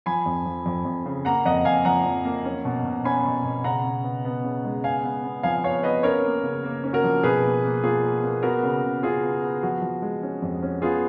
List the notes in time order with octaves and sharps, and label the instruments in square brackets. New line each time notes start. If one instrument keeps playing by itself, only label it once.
[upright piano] F3 G#5 B5
F2
F3
F2
F2
C#3
A#3 F#5 A#5
F2 D#5 F#5
F2 F5 G#5
F3 F#5 A#5
F2
A#3
C#4
B2
B2
C#4 G#5 B5
B2
B2
C#3 F#5 A#5
C#3
B3
B3
C#3
G#3
B3 F5 G#5
B3
B3
F3 F5 G#5
B3 C#5 F5
B3 B4 D#5
C#4 A#4 C#5
A#3
C#3
A#3
C#4
F#4 A#4
F3
B2 G#4 B4
A#3
A#3
A#3 F4 G#4
A#3
A#3
B3 F#4 A#4
C#3
C#3
C#3 F4 G#4
B3
B3
F3 F#4
F3
G#3
C#4
F2
C#4
B3 F4 G#4